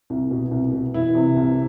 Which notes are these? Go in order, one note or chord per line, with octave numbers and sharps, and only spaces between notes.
C2
B2
C2
B2
E3 E4
C3
C2